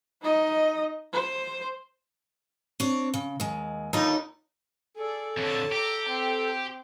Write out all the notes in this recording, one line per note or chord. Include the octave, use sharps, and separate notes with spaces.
D#4 D#5
C5
C4 D4 C#5
C#3
D#2 G#3
D#2 D3 D#4 F4
G#4 A4 D5
F2 D3 C#5 A5
G4 A#5 D6
C4